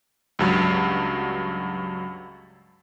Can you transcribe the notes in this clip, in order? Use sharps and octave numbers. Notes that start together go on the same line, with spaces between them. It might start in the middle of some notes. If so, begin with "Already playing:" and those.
C#2 G2 F#3